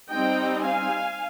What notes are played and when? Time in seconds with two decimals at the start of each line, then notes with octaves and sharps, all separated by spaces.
0.10 G3 C4 D#4 D#5 G5
0.65 F5 G#5